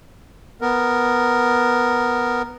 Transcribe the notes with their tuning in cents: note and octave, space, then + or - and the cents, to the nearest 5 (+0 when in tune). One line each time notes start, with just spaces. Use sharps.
B3 +0 A#4 +0